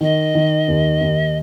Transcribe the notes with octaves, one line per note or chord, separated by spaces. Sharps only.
D#3 D#5
D#3
D#2
D#2